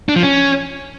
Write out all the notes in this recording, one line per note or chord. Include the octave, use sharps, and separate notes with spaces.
D4
F3
C#4